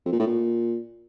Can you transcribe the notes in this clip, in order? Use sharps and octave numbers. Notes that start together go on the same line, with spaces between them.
F2
A#2
A2
A#2